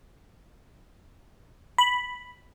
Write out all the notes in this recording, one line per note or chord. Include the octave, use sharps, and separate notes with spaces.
B5